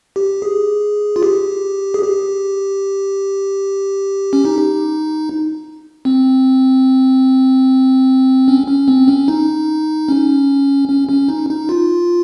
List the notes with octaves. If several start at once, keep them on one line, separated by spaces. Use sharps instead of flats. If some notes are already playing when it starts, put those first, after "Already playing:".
G4
G#4
F4
G4
G#4
G4
C#4
D#4
C4
C#4
C#4
C4
C#4
D#4
C#4
C#4
C#4
D#4
D#4
F4